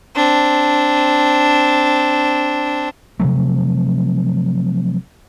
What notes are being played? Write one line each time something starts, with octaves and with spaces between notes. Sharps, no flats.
C4 D4
C3 F3 F#3 A3